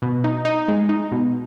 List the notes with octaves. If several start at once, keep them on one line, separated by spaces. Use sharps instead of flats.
B2
D#4
D#4
G#3
D#4
B2